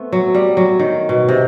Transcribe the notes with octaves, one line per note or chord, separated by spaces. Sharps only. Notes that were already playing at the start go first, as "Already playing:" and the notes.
Already playing: A3 B3 C4
F#3
G3
F#3
D#3
B2
C3